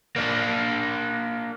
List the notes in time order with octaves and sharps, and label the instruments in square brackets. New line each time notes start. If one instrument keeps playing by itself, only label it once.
[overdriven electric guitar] A#3 D4